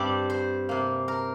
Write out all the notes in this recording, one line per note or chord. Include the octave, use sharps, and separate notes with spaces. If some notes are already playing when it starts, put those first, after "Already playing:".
Already playing: G2 G3 C4 D5
C5
C3 A#3
A#4